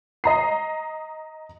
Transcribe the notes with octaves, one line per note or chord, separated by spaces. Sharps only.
D#5 A#5 C7